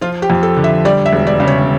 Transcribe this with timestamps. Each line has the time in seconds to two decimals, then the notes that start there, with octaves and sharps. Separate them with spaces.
0.01 F3 F4
0.22 G4
0.30 F2
0.43 A4
0.57 D3
0.64 E5
0.85 G3 D5
1.06 E5
1.13 E1
1.27 D5
1.40 C#3
1.47 C#5